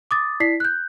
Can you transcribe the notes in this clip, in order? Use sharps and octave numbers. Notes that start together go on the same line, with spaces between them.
D6 D#6 A6
E4 D5 B6 C7
F#6 G6